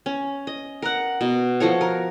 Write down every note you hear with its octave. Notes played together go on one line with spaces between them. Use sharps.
C#4
D#5
A#4 F#5
B2
F3 F#4 A4 C#5
A#4